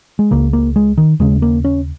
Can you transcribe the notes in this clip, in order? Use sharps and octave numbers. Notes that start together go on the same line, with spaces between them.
G#3
C#2 C#3 A#3
A#3
G#3
D#3
D#2 C#3 G#3
A#3
C#4